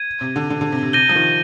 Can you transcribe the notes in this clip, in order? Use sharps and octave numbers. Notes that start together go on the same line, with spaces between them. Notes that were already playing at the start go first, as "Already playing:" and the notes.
Already playing: G#6 D#7
C3
D3
D3
D3
C3
C3
C3 G6 A#6 D#7 G7
F3
D#3